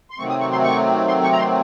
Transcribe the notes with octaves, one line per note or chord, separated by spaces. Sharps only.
C6
C3 D#3 F#3 A3 C4 C#6
D#6
C#6
C6
C#6
C6
C#6
A#5
C6